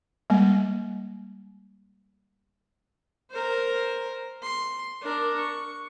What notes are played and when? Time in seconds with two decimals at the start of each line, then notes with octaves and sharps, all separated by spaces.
0.30 G3 G#3 A#3
3.31 A#4 C5
4.42 C6
5.02 D4 A#4
5.37 C#6